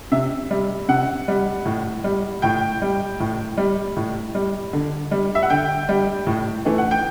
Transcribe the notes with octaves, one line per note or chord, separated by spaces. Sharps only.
C3 E5
G3
C3 F#5
G3
A2
G3
A2 G5
G3
A2
G3
A2
G3
D3
G3
E5
F#5
D3 G5
G3
A2
E3 A3
F#5
G5